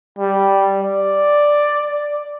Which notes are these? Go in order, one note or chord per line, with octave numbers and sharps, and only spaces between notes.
G3
D5